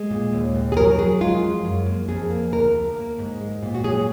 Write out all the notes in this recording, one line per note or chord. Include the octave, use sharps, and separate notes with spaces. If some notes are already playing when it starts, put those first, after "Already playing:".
Already playing: G#3
A#2
D#2
D#2
G#4
F#3 A#4
F#3 G#4
G#3 F4
F2
F#2
A#3
F2 G#4
A#3
D2 A#4
D2
A#3
G#2
G#3
A#2
F#4
F#3 G#4